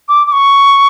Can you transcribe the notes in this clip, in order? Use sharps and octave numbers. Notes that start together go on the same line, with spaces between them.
D6
D6
C#6